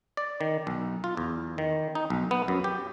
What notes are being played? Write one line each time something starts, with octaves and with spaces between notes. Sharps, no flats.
D5
D#3
B1
F4
E2
D#3
D#4
B1
B3
F#2
G4